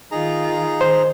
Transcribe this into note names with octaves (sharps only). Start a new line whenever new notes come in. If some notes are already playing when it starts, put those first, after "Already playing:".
D#3 D#4 F4 G#4 A#5
D#3 C5